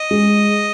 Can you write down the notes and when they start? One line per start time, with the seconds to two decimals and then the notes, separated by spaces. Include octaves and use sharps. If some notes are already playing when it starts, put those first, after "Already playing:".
Already playing: D#5
0.11 G#3